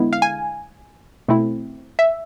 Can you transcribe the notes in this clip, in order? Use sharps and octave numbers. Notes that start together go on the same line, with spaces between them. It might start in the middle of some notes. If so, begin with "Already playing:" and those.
Already playing: D3 G#3 B3 E4
F5
G#5
B2 A3 C4 E4
E5